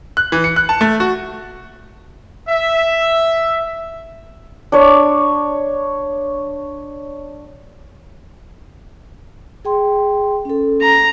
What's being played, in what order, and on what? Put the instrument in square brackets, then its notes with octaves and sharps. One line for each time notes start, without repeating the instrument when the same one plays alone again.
[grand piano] F#6
E3
C#7
F#6
A5
A3
F#4
[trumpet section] E5
[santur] D4 C#5
[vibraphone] G#4 G5 C6
C#4 A4
[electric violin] A#5